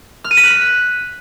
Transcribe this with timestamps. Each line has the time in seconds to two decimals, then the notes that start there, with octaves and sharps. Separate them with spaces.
0.24 F6
0.31 D#7
0.37 B6
0.44 F#6
0.50 B6